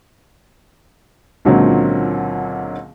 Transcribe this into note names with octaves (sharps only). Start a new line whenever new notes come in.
C#2 A#2 D3 F#3 C4